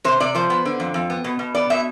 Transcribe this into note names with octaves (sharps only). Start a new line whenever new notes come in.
C3 C5
C3 D5
F3 C5
B3
D3
F2
F2
B3
B2
B2
B3 D5
B2 E5